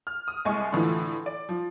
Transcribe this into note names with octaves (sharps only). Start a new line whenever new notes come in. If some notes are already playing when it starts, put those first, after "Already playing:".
F6
D#6
C2 G#3 G#5 C#6
A2 D3 E3 F3
D5
F3